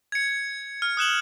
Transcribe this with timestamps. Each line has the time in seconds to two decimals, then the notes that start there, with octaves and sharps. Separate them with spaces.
0.12 G#6 C#7
0.82 F6
0.97 D#6 F#6 E7 F#7